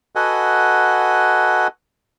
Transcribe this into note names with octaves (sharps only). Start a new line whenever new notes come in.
F#4 A4 B4 D#5 F#5 G#5